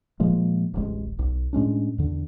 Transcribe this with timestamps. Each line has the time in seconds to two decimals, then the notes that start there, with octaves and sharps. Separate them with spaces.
0.20 A#2 F3 G#3 A#3
0.74 D1 A1 G#3
1.19 B1
1.53 A2 G#3 C#4 D4
1.98 E2 D3